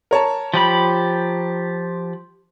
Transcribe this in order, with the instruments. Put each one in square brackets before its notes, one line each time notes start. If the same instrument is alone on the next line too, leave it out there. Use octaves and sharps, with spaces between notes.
[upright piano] A#4 C#5 A5
[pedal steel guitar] F3 G4 B5